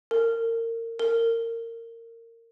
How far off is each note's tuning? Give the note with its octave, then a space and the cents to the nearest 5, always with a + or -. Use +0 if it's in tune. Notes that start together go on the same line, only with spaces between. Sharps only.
A#4 -30
A#4 -25